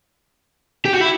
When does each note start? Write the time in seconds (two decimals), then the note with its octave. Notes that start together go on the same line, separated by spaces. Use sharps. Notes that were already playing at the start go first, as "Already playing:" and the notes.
0.85 G4
0.93 F#4
1.01 E4